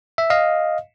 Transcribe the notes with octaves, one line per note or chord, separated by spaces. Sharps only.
E5
D#5 F5